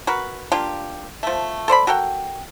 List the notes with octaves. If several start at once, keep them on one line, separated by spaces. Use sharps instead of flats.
F#4 A#4 B4
A#3 D4 F4 G4
F3 A3
A4 C5 D5 B5
F#4 A4 A#4 G5